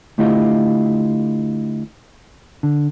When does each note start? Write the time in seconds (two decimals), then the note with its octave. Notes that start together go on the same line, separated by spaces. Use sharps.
0.18 D3 A3 E4 F4 G4 D#5
2.63 D3